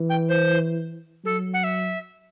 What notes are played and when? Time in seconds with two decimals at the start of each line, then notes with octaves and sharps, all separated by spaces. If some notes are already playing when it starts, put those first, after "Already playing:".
Already playing: E3
0.10 G5
0.29 C5
1.25 F#3 A4
1.54 F#5
1.64 E5